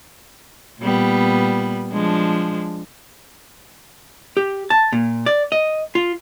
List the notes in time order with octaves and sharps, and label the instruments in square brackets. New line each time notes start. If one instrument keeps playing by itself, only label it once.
[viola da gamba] A#2 G3 B3
F3 G#3 D4
[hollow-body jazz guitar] G4
A5
A#2
D5
D#5
F4